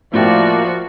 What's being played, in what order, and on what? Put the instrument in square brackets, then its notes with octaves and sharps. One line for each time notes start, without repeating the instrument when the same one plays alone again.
[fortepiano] A2 E4 G5 [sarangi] F3 [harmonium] A#3 D5 [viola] F#4